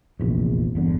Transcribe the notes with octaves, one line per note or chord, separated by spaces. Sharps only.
F1 A#1 E2
G1 E2 D3